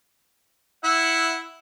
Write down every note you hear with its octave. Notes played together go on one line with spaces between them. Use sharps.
E4 E5 F#5